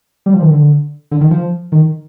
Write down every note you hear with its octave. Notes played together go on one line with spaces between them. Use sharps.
G3
F3
D#3
D3
D3
D#3
F3
D#3